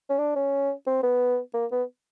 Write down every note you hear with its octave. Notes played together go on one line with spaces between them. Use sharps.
C#4
D4
C#4
C4
B3
A#3
B3